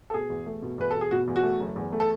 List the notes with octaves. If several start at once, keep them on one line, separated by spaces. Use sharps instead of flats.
A4
B2 G#4
E2
A3
B2
E2 B4
B2 A4
G#4
B2 F#4
E2
F#4
A3
F#1
E2
A3
A4